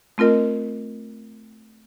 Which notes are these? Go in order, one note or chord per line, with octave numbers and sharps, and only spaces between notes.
A3 C4 F4 A#4 D#5